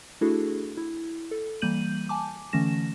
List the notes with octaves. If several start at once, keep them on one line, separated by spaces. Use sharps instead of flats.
A3 D4 E4 F#4 G#4 A4
E4
A4
E3 G3 A#3 G6 D#7 F#7
G#5 A5 D6
D3 E3 A3 C#4 A#6 E7